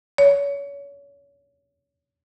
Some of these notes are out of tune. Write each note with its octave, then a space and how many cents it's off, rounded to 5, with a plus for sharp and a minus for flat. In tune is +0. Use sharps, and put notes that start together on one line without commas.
C#5 +30